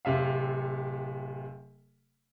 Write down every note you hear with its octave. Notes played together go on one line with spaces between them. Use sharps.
D1 C3 E5 F5